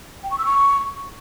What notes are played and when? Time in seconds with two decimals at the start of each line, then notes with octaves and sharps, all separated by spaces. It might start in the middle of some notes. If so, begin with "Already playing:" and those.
0.23 G5
0.31 C#6
0.38 E6
0.46 C#6